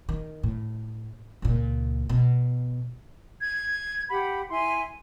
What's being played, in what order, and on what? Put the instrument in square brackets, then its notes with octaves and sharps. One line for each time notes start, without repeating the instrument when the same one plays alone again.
[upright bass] D#3
A2
C#2 A#2
B2
[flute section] G#6
G4 F#5 B5
E4 G#5 C6